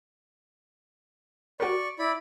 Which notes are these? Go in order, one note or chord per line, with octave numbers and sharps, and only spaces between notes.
F#4 A#4 D5 C#6
E4 D5 B5